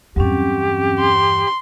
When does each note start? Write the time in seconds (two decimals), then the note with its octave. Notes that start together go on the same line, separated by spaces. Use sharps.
0.16 E2 G2 F#3 C4 C#4 G4
1.00 C6